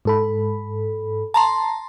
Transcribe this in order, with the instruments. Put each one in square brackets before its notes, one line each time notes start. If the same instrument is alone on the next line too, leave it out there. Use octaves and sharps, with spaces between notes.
[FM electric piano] G#2 A4 B5
[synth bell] A5 A#5 C6